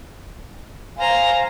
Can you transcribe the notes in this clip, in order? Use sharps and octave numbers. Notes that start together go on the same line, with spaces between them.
C5 F5 G#5 A#5